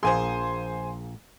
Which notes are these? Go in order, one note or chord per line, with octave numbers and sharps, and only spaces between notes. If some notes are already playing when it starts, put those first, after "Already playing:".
A#1 A#3 G#4 C5 G#5 C6